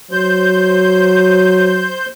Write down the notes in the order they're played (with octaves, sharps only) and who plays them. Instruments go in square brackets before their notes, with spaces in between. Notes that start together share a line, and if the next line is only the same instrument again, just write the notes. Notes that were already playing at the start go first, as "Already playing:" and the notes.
[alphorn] F#3 [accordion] C5 G6